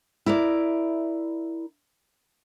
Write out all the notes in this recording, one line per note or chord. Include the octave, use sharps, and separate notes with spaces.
E4 A#4 D5